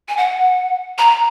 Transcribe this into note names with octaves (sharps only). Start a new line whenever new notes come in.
G#5
F#5
A#5